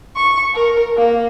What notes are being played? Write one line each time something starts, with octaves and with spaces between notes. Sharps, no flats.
C#6
A#4
A#3